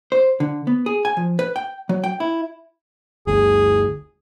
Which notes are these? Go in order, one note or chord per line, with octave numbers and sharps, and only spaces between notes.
C5
D3
B3
G#4
G#5
F3
B4
G5
F#3
G5
E4
G1 D2 G#4